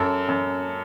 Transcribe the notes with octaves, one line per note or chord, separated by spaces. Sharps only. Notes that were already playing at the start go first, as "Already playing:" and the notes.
Already playing: F#2 A4
F#2